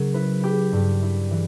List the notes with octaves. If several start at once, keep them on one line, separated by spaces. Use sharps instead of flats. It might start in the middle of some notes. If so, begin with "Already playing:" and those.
Already playing: C#3 F#3 A#4
E4 B4
E4 G4
G2
E4
E3